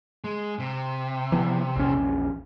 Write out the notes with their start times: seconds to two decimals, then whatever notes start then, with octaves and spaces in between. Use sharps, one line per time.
0.24 G#3
0.59 C3
1.32 E3 F3 B3
1.76 A#1 E2 C#4